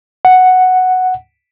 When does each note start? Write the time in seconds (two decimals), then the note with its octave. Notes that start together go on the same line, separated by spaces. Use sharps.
0.25 F#5